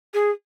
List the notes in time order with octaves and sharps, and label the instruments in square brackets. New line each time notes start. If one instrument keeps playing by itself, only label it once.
[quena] G#4